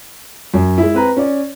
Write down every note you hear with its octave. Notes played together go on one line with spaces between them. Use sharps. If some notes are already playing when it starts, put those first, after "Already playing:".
F#2
G#3 E4
C4 B4 A#5
C#4 D5